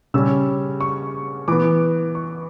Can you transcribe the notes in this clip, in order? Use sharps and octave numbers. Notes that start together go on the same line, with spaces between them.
C#3 G3 C#4 E6
C#6
E3 B3 D6
C#6